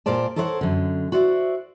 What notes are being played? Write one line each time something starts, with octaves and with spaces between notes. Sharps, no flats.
A#2 A#4 C5 D5 A5
A4 A#4 C5 C#5 D#5 F#5
F#2 D3
F#4 C5 D5 E5